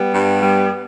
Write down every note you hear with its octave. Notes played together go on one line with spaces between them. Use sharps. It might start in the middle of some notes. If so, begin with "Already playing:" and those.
Already playing: G3 B3
G2
G3